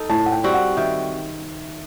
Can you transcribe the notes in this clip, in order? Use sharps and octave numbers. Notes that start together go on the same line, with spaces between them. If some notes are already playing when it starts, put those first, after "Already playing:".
Already playing: D#4 A4
A2 A5
F#5
G5
G3 C4 F#4
F#5
D#3 E5